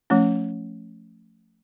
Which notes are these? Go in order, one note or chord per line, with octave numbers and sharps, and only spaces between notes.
F3 A3 C#4